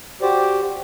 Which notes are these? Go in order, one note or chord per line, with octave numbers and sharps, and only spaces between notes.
F#4 G4 C5 D5